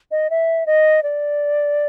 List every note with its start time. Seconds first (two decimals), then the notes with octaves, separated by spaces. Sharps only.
0.11 D#5
0.30 E5
0.66 D#5
1.03 D5